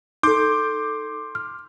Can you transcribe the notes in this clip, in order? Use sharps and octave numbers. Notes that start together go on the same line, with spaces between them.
D#4 A4 C6 D6 G6
F6